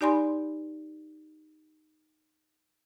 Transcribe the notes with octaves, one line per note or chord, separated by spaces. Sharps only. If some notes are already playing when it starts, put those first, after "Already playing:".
D#4 G4 D5 G#5 B5 C6